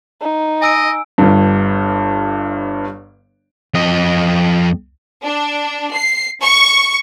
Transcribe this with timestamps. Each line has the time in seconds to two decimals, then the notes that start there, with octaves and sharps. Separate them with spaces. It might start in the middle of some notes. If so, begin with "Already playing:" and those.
0.21 D#4
0.62 D#5 G#5 E6 D7
1.18 G1 G2
3.74 F2 D#5
5.24 D4
5.94 C7
6.41 C#6